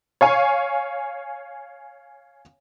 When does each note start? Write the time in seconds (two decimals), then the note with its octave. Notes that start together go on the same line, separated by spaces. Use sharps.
0.21 C#5 F5 G#5